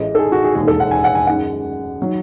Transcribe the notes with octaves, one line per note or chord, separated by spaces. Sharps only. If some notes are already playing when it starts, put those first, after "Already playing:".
Already playing: A1 A2 G#3 D#5
A4
G#4
F#4
G#4
E1 D#2 D#3 G#4
A4
F#5
G#5
F#5
G#5
F#2 D#3 G#3 F#5
D#3 F#3